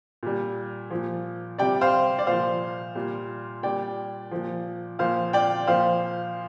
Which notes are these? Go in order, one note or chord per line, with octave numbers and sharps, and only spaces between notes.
A#2 G3
A#2 F3
C3 G3 D5 G5
C5 F5
D5
A#2 F3 C5 F5
A#2 G3
A#2 G3 D5 G5
A#2 F3
A#2 F3 C5 F5
D5 G5
A#2 F3 C5 F5